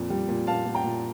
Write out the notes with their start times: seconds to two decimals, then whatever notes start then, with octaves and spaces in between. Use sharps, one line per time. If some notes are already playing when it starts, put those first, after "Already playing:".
Already playing: F2 A#2
0.10 G3
0.29 A#2
0.47 A#2 F5 A5
0.66 A#2
0.75 G5 A#5
0.84 A#2